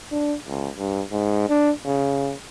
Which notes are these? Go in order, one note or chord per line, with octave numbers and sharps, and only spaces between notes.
D4
C#2
G2
G#2
D4
C#3